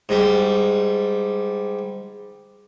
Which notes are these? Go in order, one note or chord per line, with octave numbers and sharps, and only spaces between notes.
G#2 G3